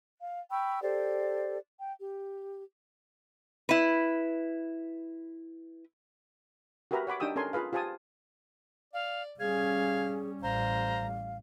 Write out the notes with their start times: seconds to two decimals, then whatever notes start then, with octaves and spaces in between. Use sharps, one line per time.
0.22 F5
0.51 G5 B5 C#6 E6
0.83 G4 A4 C5 D5
1.81 G5
1.99 G4
3.69 E4 B4
6.91 F#4 G4 A#4 B4 E5 A#5
7.07 C#5 F#5 B5 D6
7.20 D4 D#4 G4 G5 D#6 E6
7.36 C#4 A4 A#4 G#5 C6
7.53 F4 G#4 B4 F5
7.73 F4 G4 C5 G#5 A5 D#6
8.94 D5 F5
9.40 G3 C#4 G#4 F5 G#6
10.43 A1 G3 C5 F5 A#5